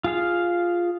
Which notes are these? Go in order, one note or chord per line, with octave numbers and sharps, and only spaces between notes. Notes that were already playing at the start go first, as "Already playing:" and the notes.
F4 G#4 F5